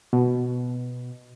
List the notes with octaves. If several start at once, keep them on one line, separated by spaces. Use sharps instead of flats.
B2